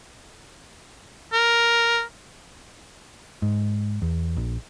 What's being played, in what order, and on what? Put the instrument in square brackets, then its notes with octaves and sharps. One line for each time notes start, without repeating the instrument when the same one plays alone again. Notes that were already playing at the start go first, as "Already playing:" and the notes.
[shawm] A#4
[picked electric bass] G#2
E2
A#1